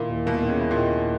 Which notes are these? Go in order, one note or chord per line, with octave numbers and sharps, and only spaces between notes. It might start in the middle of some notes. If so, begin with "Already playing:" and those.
Already playing: A#2 D#3 A#3 E4
D#2
B2 A#3
D#3
C#3
E4
A#2
D#3